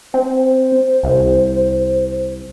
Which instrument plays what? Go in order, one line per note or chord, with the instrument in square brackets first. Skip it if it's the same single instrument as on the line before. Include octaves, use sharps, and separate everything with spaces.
[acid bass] C4 [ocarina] C5
[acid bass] C2